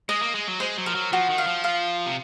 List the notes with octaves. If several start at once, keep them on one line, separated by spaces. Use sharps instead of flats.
G#3 D#5
A#3
G#3
F#3
G#3 C5
F#3
F3 A#4
F#3
F3 F#4
D#3
F5
F3
F5
C3